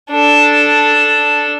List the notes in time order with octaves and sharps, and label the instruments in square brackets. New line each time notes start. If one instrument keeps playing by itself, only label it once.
[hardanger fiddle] D4 A4